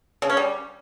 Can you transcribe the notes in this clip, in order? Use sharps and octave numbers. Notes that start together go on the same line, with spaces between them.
C#3
C#4
G3